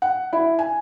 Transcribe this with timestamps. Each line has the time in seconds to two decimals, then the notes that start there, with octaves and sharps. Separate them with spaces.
0.02 F#5
0.33 E4
0.59 G#5